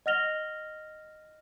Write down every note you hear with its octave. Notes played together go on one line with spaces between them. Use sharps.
D#5 F#5 F6 A#6 F7 G7